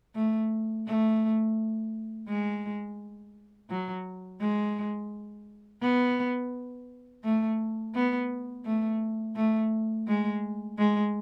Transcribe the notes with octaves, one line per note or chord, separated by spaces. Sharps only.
A3
A3
G#3
F#3
G#3
B3
A3
B3
A3
A3
G#3
G#3